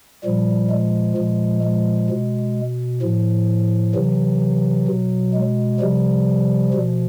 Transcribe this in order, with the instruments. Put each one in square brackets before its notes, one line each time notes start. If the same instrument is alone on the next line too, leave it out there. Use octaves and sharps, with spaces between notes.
[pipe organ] A#2 F3 G3
G#3
A#2 F3
G#3
B2
A2 F3
C3 E3 F#3
B2
G#3
C3 F3 G3
B2 F3